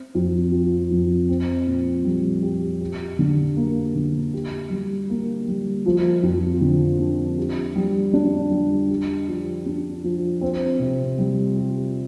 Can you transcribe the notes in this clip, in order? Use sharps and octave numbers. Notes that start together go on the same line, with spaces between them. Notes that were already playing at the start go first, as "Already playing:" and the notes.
Already playing: C4
F2
F3
F2
C4
A#2
G3
G4
G4
D3
A#3
D3
G4
G3
A#3
G3
F3
F2
D3
D4
G4
G3
D4
G3
G4
F3
D4
F3
C4
C3
G3
G4